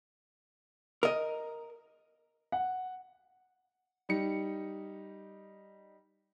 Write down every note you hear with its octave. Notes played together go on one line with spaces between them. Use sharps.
A#4 D#5
F#5
G3 D#4 C#7